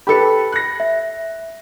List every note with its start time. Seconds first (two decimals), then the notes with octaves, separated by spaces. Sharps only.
0.07 G4 A4 B4 B5 C#7
0.52 F#6 A#6
0.80 E5